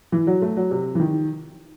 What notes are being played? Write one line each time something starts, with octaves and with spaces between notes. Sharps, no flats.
E3
F#3
A3
F#3
C3
E3
D#3